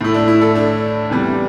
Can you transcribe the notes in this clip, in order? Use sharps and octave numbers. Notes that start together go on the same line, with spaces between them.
A2 A3 E4
D4
E4
A4
D4
E2 C3 E3 G3